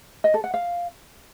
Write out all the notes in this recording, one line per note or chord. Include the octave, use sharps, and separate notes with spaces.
D#5
A4
F#5
F5